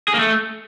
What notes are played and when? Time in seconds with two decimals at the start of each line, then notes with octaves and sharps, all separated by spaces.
0.08 G#4
0.14 A#3
0.19 A3